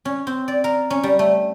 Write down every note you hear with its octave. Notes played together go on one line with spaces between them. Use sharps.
C#4
C4
D5
A#4
C#4
G3
A3